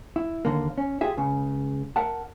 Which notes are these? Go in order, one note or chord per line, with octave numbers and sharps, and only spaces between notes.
E4
D#2 G#2 D3 A#3
C#4
F4 G4 G#4 E5
C#2 C#3
A#4 E5 F#5 A5